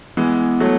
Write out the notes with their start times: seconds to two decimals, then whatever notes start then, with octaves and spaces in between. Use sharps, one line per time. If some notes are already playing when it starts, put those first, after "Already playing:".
0.17 E3 G#3 B3
0.60 F#3 A3